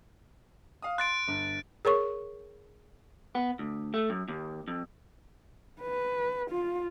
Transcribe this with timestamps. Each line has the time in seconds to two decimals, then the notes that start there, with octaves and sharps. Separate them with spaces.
0.82 F5 D#6
0.98 C6 F#6 A6 D7
1.28 G1
1.85 G#4 A#4 C#5 C#6
3.35 B3
3.59 D2
3.94 A3
4.10 F#2
4.28 D#2
4.68 F2
5.82 B4
6.51 F4